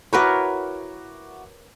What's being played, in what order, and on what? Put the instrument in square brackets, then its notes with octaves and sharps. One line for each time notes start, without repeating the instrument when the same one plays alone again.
[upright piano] E4 F#4 D6 [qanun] A#4 B4 C#5